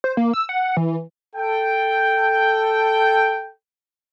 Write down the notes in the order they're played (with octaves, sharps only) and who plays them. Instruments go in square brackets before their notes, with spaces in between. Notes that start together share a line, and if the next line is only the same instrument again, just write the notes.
[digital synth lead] C5
A#3
E6
F#5
E3
[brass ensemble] A4 G5